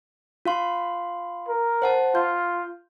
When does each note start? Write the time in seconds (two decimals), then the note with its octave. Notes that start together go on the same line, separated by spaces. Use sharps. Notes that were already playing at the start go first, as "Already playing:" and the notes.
0.45 F4 F5 C6
1.49 A#4
1.82 C5 F#5 A5
2.15 F4 G6